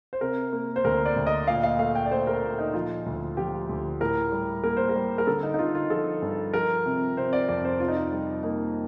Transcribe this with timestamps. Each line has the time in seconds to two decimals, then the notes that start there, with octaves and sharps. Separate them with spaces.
0.13 C5
0.21 C3 A#4
0.53 A#3
0.76 C5
0.84 D2 A#4
1.06 D5
1.16 D2
1.27 D#5
1.47 A#2 F5
1.63 F5
1.79 A3 F5
1.95 G5
2.06 D5
2.11 A3 C5
2.27 A#4
2.42 A#2
2.59 D#4
2.74 F3 F4
3.06 D2
3.37 F3 G4
3.69 D2
4.00 A2 A#4
4.32 G3
4.64 A#3 A#4
4.77 C5
4.89 A#4
4.95 G3
5.18 A#4
5.27 D3 A4
5.43 D#4
5.54 D#4
5.59 D3 F4
5.75 F4
5.90 F3 A4
6.22 G2
6.54 F3 A#4
6.86 C3
7.17 C3 C5
7.33 D5
7.49 F2 D5
7.65 C5
7.80 C3 F4
7.88 D#4
7.96 F4
8.12 G3
8.43 A#3 D#4